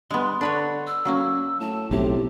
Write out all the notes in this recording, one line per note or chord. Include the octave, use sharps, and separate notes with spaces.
G2 G#3 B3 C6
D3 D4 B4 C#5
E6
F#2 F#3 A#3 C#4
A2 A5
B1 A2 C3 G4